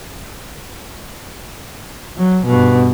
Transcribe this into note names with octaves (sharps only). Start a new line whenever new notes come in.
F#3
G2 B2